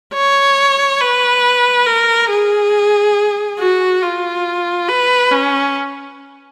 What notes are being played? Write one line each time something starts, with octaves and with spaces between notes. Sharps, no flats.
C#5
B4
A#4
G#4
F#4
F4
B4
C#4